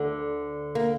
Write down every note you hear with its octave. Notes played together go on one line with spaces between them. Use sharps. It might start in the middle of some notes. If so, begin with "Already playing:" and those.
Already playing: D2 D3
A#3